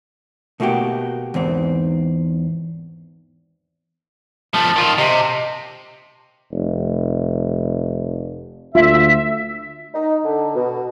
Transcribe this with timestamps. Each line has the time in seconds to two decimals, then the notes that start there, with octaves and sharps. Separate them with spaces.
0.60 B2 A3 A#3 F#4 G4
1.34 E2 G#2 C4
4.54 F3 A3 A5
4.76 D#3 F4
4.98 C3 D#5
6.52 F1
8.75 D2 F4 E5
9.94 D#4
10.25 D3
10.55 B2